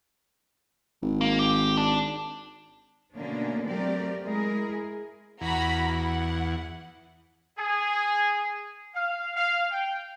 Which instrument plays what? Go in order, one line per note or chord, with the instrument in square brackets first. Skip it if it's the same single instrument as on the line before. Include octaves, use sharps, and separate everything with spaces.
[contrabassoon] G#1
[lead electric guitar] A#3
G4
D4
[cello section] B2 D3 A3 A#3 C#4 D4
F#3 A3 C4 G4 A#4 D5
G#3 E4 G#4 A#4
[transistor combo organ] E2 [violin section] F#4 A#5 B5
[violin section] F#5
[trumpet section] G#4
F5
F5
G5